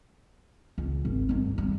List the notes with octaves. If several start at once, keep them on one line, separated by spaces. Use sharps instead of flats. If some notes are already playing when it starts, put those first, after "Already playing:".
C#2
G#1
G2 D#3
G3